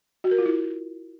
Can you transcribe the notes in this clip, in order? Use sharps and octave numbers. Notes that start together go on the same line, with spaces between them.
F#4
A#4
F4
E4